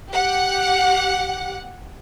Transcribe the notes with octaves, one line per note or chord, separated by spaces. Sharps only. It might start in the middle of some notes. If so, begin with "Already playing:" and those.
G4 F#5